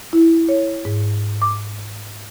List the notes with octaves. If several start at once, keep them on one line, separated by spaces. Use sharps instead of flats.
E4
C#5
G#2
D6